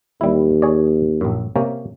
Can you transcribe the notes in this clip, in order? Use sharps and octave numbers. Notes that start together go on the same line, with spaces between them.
D#2 G3 E4
G#4 C#5 D5
A#1 F#2
C3 A#3 C#4